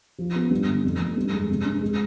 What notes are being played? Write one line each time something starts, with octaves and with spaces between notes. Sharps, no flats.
F3
B3
G2
G1
F2
F1
G2
G#3
C3
D4
G#3